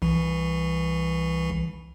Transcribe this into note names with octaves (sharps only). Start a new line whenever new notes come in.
C2 E3